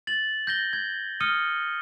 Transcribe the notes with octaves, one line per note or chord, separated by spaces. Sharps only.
A6 F#7
G6 A#6 G7
G#6
D#6 F6 C#7 D#7 G7